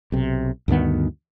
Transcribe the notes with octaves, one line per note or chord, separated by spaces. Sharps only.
B1 C3
D2 G2 D#3 B3